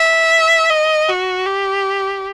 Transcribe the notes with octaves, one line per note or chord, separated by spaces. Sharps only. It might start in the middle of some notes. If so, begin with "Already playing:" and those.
Already playing: E5
D#5
F#4
G4